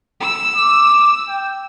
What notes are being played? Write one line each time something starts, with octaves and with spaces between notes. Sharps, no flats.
E6
D6
G5